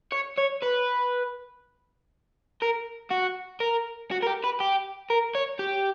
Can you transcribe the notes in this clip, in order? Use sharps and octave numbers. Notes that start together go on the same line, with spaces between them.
C#5
C#5
B4
A#4
F#4
A#4
F#4
A#4
G4
B4
G4
A#4
C#5
G4